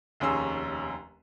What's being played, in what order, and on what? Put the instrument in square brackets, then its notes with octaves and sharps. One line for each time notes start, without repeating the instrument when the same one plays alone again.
[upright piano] F1 D#2 C#4 G#4 C6 E6